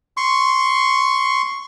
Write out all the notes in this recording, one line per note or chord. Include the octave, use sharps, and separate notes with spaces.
C6 C#6